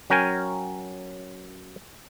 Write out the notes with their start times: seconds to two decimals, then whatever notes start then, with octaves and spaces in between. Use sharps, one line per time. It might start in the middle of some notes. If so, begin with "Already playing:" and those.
0.10 F#3 C#4 A#4 G5 G#5